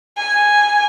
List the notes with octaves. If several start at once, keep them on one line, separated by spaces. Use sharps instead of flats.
G#5